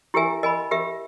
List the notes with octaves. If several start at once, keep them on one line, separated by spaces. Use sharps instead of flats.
E4 G4 A#4 E5 G#5
A#4 D#5 G#5 B5
G4 A#4 E5